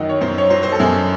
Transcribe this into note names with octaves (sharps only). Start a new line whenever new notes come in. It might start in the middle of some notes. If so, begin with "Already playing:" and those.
Already playing: F#2 D#3 F#3 D#5 F#5
C#5
F#2 C5
C#5
F#3 C5
C5
A4
F#2 G#4